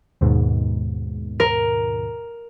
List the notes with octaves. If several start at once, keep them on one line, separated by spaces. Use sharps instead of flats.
D#2 G#2 B2
A#4